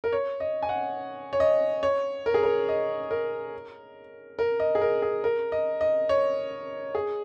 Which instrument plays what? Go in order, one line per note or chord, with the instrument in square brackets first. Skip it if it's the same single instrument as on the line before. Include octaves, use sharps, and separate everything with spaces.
[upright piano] A#4
C#5
D#5
G#5
F#5
C#5
D#5
C#5
A#4
G#4
A#4
D#5
A#4
A#4
D#5
G#4
A#4
G#4
A#4
D#5
D#5
C#5
G#4